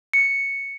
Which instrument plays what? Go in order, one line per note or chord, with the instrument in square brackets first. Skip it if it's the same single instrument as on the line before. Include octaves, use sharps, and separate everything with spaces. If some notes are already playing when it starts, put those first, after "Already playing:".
[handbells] C#7